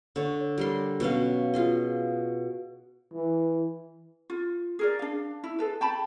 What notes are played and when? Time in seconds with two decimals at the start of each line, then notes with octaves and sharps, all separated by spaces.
0.16 D3 C#5
0.58 G3 A#4 C6
1.00 B2 F#3 C#4 F5
1.54 F4 G#4 D#5
3.13 E3
4.30 F4
4.79 G#4 A#4 D5
4.99 D4 F5
5.44 E4
5.59 G#4 A4 B4
5.81 G5 A5 B5